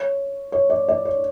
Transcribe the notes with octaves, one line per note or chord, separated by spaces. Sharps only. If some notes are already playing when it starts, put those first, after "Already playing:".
Already playing: C#5
C#5
D5
D5
C#5